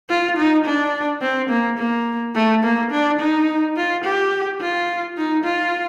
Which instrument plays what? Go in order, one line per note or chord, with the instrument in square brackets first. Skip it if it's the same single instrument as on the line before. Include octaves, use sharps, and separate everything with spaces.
[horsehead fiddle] F4
D#4
D4
C4
A#3
A#3
A3
A#3
D4
D#4
F4
G4
F4
D#4
F4